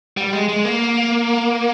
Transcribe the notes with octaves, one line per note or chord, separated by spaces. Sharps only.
G3
G#3
G#3
A#3